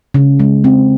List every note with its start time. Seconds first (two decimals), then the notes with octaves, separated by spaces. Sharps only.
0.14 C#3
0.40 G#3
0.64 C4